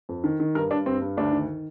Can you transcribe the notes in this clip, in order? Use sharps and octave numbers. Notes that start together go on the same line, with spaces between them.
F2
D#3
D#3
G2 A#4
G2 D4
G2 C4
G2
D2 D4
D#3